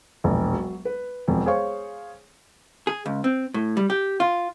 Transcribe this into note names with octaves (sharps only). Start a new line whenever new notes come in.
E1 A#1
F#3
B4
E1 F2
G#4 C5 C#5 F5 C#6
G#4
C#2
C4
A2
G3
G4
F4